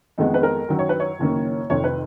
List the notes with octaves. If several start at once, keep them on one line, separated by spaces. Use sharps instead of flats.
F2 D#3 G#3 B3 D#4
B4
A#4
F#2 D#3 F#3
C#5
B4
C#5
F#1 F#2 D#3 A#3
F1 F2 D#3 C#5
B4